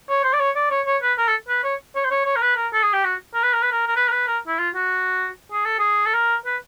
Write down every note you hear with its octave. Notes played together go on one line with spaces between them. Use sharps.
C#5
C5
D5
C#5
D5
C#5
C#5
B4
A#4
A4
B4
C#5
C#5
C5
C#5
C#5
A#4
B4
A#4
A4
G#4
G4
F#4
A#4
B4
A#4
B4
A#4
A#4
B4
A#4
B4
A#4
E4
F4
F#4
G#4
A4
G#4
A4
A#4
B4